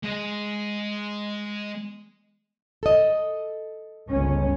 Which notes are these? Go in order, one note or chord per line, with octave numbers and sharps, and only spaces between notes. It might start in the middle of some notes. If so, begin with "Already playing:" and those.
G#3 D#5
A4 D#5
G1 C#2 C#4